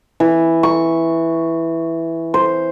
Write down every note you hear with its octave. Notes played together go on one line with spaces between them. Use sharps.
E3
C#6
C5